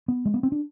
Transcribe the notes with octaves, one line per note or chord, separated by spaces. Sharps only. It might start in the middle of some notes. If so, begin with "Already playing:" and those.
B3
G#3
B3
C4
D4